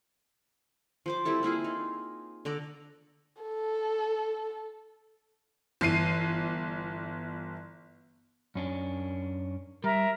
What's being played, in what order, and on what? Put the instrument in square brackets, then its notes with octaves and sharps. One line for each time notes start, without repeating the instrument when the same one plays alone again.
[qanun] F3 C5 D6
G3 C4 E4 A4
A#3 E4 F4 G#4
D#4
D3 A4 D5 A#5
[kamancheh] A4
[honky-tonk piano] G1 E3 C7 D#7
[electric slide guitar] F#2 C#4 D4
[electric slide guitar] G3 [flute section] A#4 E5